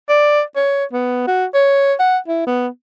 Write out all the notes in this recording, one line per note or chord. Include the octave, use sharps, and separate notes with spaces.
D5
C#5
B3
F#4
C#5
F#5
E4
B3